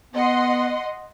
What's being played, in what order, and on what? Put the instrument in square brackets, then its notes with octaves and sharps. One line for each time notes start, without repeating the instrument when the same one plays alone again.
[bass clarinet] B3 [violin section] D#5 F#5 C6